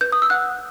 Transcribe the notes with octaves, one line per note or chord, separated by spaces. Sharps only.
B4 G6
D#6
E6
F#5 F#6